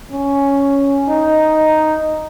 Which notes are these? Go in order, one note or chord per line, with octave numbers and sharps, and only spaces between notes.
C#4
D#4